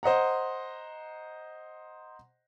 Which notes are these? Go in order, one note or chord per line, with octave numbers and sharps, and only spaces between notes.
C5 D#5 F#5 A#5